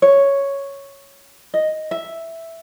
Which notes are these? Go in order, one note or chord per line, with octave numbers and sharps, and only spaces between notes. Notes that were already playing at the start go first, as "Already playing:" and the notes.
C#5
D#5
E5